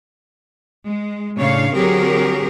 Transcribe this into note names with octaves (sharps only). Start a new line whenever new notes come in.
G#3
A2 C#3 D4 C#5 F5
D3 F#3 C4 G4 G#4 A#4